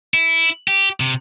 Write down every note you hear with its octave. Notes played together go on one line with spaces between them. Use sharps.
E4
G4
C3